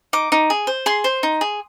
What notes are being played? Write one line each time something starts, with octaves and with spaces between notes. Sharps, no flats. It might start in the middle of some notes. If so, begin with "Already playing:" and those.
D#4 D6
D#4
G#4
C5
G#4 C6
C5
D#4
G#4